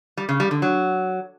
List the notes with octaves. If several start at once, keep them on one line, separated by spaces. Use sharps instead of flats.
G3
C#3
G3
D3
F#3